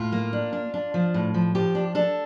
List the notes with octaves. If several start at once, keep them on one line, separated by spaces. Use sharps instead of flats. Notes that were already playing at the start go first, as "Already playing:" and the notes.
Already playing: A2 F4
A#3
D4
D4
D4
F3
A2
F3
F3 G4
D4
D4 A4